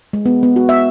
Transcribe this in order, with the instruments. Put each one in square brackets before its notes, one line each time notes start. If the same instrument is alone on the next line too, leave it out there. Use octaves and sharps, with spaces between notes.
[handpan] G#3
B3
B3
F#4
E5